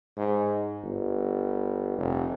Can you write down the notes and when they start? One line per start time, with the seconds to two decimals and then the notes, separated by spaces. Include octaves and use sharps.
0.17 G#2
0.83 G1
1.98 F1